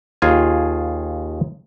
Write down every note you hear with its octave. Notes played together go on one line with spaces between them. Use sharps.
D#2 F4 G#4 G#5